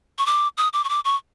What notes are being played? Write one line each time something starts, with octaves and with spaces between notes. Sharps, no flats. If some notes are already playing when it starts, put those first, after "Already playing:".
C#6
D6
D#6
D6
C#6
D6
C#6